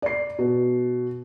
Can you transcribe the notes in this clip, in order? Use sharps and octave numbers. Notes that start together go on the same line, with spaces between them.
D5 C7
B2